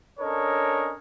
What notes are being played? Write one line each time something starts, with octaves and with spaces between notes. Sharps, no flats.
C#4 D4 A4 A#4 C#5 D#5